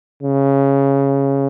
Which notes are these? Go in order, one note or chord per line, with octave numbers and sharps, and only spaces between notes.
C#3